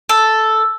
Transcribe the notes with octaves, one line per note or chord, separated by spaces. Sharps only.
A4